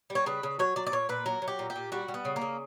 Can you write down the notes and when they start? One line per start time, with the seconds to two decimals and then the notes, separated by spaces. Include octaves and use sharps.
0.10 G3
0.15 C#5
0.26 C#3 B4
0.43 C#3
0.59 F#3 C#5
0.76 F#3 D5
0.87 D5
0.92 A#2 C#5
1.09 A#2 B4
1.26 F#3 A#4
1.42 F#3
1.48 G4
1.59 A#2
1.70 G4
1.76 A#2
1.92 G3 F#4
2.08 G3
2.14 B3
2.25 C#3
2.36 A#3
2.41 C#3